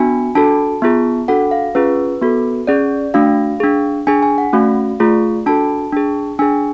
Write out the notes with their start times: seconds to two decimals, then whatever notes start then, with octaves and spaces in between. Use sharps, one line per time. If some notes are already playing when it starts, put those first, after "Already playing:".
Already playing: B3 D4 F#4 G#5
0.35 D4 F#4 A4 A5
0.82 B3 F4 G#4
1.28 D4 F#4 A4 F#5
1.51 F5
1.75 C#4 F4 G#4 B4
2.22 B3 F#4 A4
2.67 C#4 G#4 D5
3.14 A3 D4 F#4 F5
3.60 D4 G#4
4.07 D4 G#4 G#5
4.23 G#5
4.38 F#5
4.53 A3 C#4 F#4 F5
5.00 A3 F4 G#4
5.46 D4 F#4 A4 A5
5.92 D4 G#4
6.39 D4 G#4 G#5